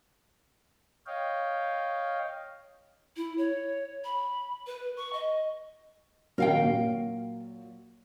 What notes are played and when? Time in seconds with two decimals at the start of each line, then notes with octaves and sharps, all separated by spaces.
1.06 C#5 D#5 F5 G5
3.16 E4
3.38 C#5
4.04 B5
4.67 B4
4.97 C#6
5.13 D#5
6.38 D#1 F#3 A#4 F5 G5
6.59 A#2 F#3